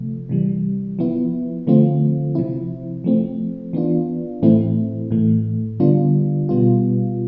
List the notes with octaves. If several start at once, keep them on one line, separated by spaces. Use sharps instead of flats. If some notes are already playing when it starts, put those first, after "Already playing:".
Already playing: C3 F3 A3
C3 E3 G3
F3 B3 E4
D3 F3 A3 C4 F4
C3 F3 C4 E4
F3 A3 C4
E3 B3 D4 F4
A2 E3 A3 C4 E4
A2 E3 A3
D3 G3 B3 D4 F4
B2 G3 B3 F4